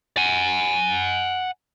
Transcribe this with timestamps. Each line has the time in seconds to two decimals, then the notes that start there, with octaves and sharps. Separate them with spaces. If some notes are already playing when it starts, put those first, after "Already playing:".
0.17 F#5 G#5